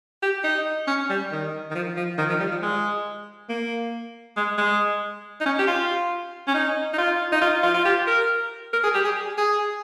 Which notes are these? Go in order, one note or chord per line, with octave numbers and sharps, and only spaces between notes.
G4
D#4
C#4
G3
D#3
D#3
F3
F3
D#3
F3
G3
F3
G#3
A#3
G#3
G#3
D#4
C#4
G4
F4
C#4
D#4
D#4
F4
D#4
F4
F4
F4
G4
A#4
A#4
G#4
G4
G#4
G#4